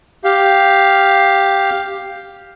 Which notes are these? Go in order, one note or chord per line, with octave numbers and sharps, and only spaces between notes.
G4 F5